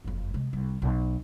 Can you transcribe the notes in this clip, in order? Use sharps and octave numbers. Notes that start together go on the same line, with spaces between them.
F#1 F2
C3 G#3
C2
B1